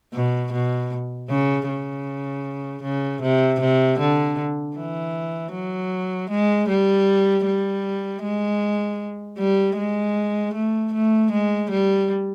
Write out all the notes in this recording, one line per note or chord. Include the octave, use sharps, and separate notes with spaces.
B2
B2
C#3
C#3
C#3
C3
C3
D3
E3
F#3
G#3
G3
G3
G#3
G3
G#3
A3
A3
G#3
G3